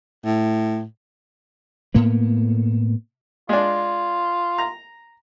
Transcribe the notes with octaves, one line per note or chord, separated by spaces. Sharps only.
A2
A2 A#3 B3
G#3 D4 F4
A#5